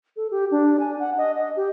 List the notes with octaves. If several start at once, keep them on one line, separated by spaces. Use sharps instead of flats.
A4
G4
D4
G#5
F#5
D#5
D#5
G4